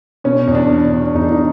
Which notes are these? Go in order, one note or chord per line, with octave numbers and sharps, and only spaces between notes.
B2 C#4
E2
D4
B2
D4
E2
E2 D#4
D4
D#4